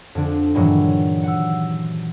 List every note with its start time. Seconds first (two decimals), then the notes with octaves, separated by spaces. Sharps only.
0.15 F2 D3 D4
0.55 G2 A#2 D#3 E3 F#3 G#3
1.23 F#5 E6